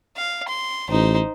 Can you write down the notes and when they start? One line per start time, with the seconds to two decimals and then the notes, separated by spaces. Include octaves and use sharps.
0.17 F5
0.48 C6
0.90 A1 D#4 C5